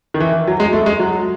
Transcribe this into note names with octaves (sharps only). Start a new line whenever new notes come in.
D#3
E3
F#3
G#3
A3
G#3
F#3